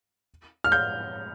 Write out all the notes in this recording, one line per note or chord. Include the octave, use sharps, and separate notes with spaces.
F6
G6